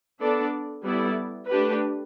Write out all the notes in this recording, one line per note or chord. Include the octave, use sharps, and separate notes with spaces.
B3 D4 A4 D5
G3 B3 E4 A4 D5
A3 D4 G4 B4